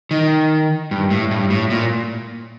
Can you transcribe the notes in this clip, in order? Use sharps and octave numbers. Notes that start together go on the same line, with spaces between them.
D#3
G2
A2
G2
A2
A#2